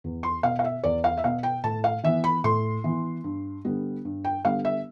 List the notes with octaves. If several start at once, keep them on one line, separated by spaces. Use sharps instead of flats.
E2
C6
B2 B3 F5
F5
E5
E2 D5
F5
E5
B2 B3 F5
G5
A2 A5
F5
E3 B3 E5
B5
A2 C6
E3 B3
G2
D3 G3 B3
G2
G5
D3 G3 B3 F5
E5